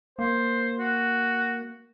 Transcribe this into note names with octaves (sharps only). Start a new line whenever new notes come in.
A#3 C5
F#4